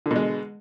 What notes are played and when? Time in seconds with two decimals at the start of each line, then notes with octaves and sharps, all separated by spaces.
0.06 D3
0.11 B2
0.16 G#3